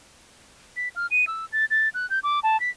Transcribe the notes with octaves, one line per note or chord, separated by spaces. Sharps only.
B6
F6
D#7
E6
A6
A6
F#6
G6
D6
A5
B6